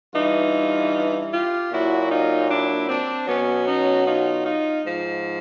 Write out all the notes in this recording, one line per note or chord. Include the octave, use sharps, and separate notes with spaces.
G2 E3 D#4 F4
F4 G4
A#2 F#3 E4 F#4
D#4 F4
D4 E4
C4 D4
B2 F#3 B3 C#4
C#4 D#4
D#4 F4
D#4 F4
G#2 F3